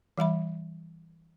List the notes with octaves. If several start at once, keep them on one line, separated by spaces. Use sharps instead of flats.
E3 G3 E5 B5